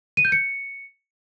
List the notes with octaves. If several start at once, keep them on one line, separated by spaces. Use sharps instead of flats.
D#7
G6
C#7